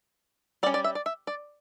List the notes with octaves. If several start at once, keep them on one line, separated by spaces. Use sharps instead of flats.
G3 C#4 D5
D5
E5
D5
E5
D5